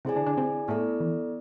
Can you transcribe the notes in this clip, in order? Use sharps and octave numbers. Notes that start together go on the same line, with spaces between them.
C3 C4 E4 G#4 D5 G#5
D3 D4
D3 D4
C3 C4
A2 A3 B3 E4 A4 D5
E3